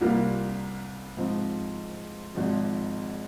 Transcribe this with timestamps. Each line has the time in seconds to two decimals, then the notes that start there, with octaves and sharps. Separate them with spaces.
0.01 C2 C3 G3 A#3 F4
1.17 G#2 F3 C4
2.35 G#1 G#2 F3